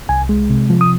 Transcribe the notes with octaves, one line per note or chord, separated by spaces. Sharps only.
C2 G#5
G#3
C3
F3
D#6